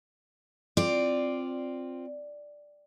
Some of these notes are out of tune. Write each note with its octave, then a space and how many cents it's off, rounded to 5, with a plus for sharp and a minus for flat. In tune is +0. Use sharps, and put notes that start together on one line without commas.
C4 +0 F4 +0 D5 +0